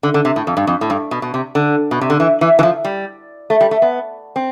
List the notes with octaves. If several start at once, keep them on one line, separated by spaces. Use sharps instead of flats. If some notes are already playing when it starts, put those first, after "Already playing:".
D3
D3
C3
A2
F2
G2
F2
A2
G2
B2
B2
C3
D3
B2
C3
D3
E3
E3
E3
F3
G3
A3
G3
A3
B3
C4